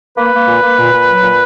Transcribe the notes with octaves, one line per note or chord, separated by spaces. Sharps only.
A#3 B4
A#3
A#2
A#3
A#2
A#2
F#3
A#2